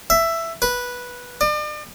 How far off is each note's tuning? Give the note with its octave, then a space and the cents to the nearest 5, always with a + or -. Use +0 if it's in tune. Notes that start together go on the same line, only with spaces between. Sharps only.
E5 +10
B4 -10
D5 +40